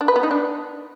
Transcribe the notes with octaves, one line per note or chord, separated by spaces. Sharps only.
D4
B4
B3
D#4
D4